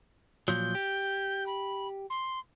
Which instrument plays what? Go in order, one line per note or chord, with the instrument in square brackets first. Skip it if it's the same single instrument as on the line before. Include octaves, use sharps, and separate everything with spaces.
[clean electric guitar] A#2 F3 F#3 [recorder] G6
[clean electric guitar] G4
[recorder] B5
C6